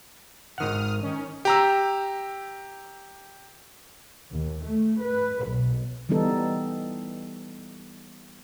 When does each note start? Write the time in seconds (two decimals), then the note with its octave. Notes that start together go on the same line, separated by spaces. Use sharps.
0.58 G#1 D#3 F#5 D#6 F6
1.02 D#3 C#4
1.45 G4 A#5 E6
4.34 D#2
4.64 A3
5.04 B4
5.49 B1
6.09 E3 G3 B3 D#4 A4